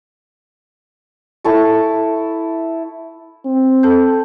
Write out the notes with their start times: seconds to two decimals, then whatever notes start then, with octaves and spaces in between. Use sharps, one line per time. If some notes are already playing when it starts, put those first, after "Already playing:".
1.44 E4 A4 C#6
3.46 C4
3.83 A4 A5 G6